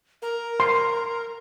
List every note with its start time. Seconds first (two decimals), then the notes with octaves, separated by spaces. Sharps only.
0.22 A#4
0.60 C6